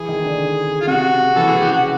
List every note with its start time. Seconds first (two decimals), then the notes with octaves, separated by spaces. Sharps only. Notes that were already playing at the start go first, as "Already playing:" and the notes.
Already playing: E3 G#4
0.08 D#3
0.24 D3
0.41 C#3
0.81 F4
0.88 C3 F#4
1.12 C#3
1.36 E3 A4
1.47 E3 G#4
1.60 G4
1.68 C#3 F#4